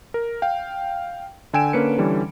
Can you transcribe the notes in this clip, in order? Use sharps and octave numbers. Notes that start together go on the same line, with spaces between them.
A#4
F5 G5
D3 G5 G#5 E6 D7 E7
D3 A#3 C#4 B4 C#7
D3 E3 G3 C#4